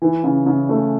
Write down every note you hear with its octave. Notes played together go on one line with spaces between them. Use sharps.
E3
C#3
C#3
A3